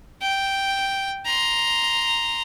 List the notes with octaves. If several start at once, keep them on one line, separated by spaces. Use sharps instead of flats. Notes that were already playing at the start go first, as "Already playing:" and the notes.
G5
A#5 C6